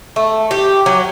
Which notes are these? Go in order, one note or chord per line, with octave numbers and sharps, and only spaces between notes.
A3
G4
F#3